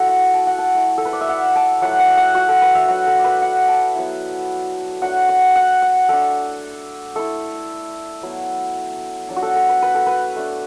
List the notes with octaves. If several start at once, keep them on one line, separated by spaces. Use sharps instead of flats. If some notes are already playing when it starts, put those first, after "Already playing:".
Already playing: A3 E4 F#4 A4
F#5
A5
F#5
A5
A3 E4
A4
B4
D5
E5
F#5
A5
F#3 A3 E4 F#5
F#5
F#5
F#4
A4
B4
E5
F#3 D4 F#5
A4
D5
B4
F#5
A5
F#3 B3 E4
F#3 A3 D4 F#5
F#5
F#5
F#5
A3 D4 A4
A3 E4 A4
F#3 B3 E4
F#3 D4
F#4
A4
A4
B4
B4
A4
B4
A3 D4